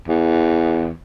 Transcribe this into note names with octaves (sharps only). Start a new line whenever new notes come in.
E2